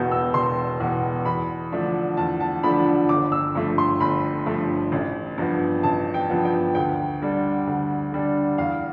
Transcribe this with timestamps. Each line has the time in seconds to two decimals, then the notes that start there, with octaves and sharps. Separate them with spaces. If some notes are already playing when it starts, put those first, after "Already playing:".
Already playing: E1 E2 B2 B3 G6
0.12 E6
0.34 E1 C6
0.80 E2 B2 B3
1.25 E2 B5
1.72 D3 F3 A3 D4
2.17 E2 A5
2.40 A5
2.63 D3 F3 A3 D4 B5
3.09 G1 D6
3.32 E6
3.55 G2 F3 A3
3.78 C6
4.00 G1 B5
4.46 G2 F3 A3
4.92 A1
5.38 G2 F3 B3
5.83 A1 A5
6.14 G5
6.30 G2 F3 B3
6.45 G5
6.75 D2 G5
7.22 D3 G3 D4
7.67 D2
8.12 D3 G3 D4
8.58 E2 F5